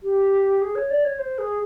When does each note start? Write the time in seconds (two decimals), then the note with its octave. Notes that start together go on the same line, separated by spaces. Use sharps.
0.03 G4
0.61 G#4
0.75 C#5
0.90 D5
1.05 C#5
1.19 C5
1.38 G#4